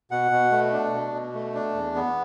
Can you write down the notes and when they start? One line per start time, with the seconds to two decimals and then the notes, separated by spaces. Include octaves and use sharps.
0.11 B2 F#5
0.31 B2
0.52 A3
0.73 D4
0.93 B2
1.14 B2
1.34 A3
1.55 D4
1.75 E2
1.95 B3